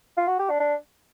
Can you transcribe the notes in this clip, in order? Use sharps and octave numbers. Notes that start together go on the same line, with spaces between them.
F4
F#4
G4
D4
D4